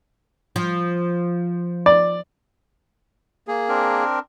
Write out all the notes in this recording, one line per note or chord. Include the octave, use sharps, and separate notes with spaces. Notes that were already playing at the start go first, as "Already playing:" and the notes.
F3
D5
A#3 G#4
C4 D4 A#4